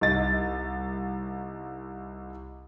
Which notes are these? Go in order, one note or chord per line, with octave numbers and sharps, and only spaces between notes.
C2 D#4 D#5 A6